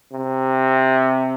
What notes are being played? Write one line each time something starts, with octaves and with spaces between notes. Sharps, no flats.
C3